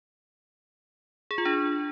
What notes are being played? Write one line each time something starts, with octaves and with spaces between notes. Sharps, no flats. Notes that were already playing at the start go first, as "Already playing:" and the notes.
G#4
F4
D4